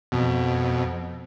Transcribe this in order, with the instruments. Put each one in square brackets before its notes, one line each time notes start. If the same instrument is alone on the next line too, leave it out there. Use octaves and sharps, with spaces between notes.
[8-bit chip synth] F2 B2